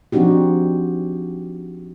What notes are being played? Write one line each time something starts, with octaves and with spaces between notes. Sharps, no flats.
F3 C4 D4 D#4 F#4 G4